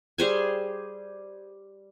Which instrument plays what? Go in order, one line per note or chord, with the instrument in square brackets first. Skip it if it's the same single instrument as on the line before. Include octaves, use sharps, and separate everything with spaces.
[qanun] G3 G#4 C5 G#5